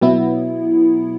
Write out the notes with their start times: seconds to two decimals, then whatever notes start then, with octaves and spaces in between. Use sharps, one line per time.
0.01 B2 F#3 B3 E4